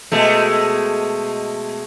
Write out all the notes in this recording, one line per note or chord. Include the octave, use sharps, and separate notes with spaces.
B2 G#3 A3